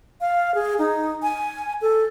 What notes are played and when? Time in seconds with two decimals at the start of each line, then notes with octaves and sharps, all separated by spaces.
0.21 F5
0.55 G#4
0.79 D#4
1.23 G#5
1.81 A4